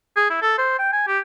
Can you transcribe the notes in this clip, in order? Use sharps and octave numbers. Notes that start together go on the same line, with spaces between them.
G#4
E4
A4
C5
G5
G#5
G4